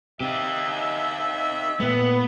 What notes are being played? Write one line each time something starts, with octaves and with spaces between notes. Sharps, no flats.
C3 D#4 G4 E5
A#2 A3 B3